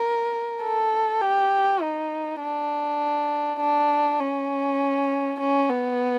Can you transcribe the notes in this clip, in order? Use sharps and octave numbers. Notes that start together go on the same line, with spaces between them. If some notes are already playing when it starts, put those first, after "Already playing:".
Already playing: A#4
A4
G4
D#4
D4
D4
C#4
C#4
B3